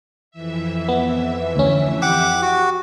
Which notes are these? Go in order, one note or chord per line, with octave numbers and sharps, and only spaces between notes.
F2 E3 E5
B3
D2 C#4
G4 F#5 D6
F#4